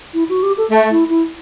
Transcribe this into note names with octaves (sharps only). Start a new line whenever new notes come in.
E4
F#4
G4
A4
A3
E4
E4